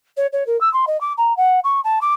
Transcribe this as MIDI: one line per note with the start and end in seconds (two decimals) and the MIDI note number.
0.17 0.26 73
0.32 0.46 73
0.46 0.59 70
0.60 0.71 88
0.73 0.85 84
0.87 0.99 75
1.00 1.13 86
1.17 1.35 82
1.37 1.59 78
1.64 1.80 85
1.84 1.99 81
2.01 2.13 86